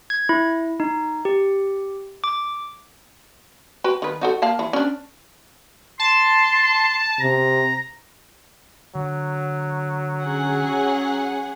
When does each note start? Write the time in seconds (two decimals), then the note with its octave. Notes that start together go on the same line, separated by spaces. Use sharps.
0.10 G#6
0.29 E4
0.80 D#4
1.25 G4
2.24 D6
3.84 F#4 B4 G5
4.02 D#3 B4
4.21 D#4 F#4 A4
4.42 A#3 F5 A5
4.59 E3
4.73 C#4 D4
5.99 A5 C6
7.20 C3 A#5
8.95 D3 F#3
10.25 C#4 G#4 F#5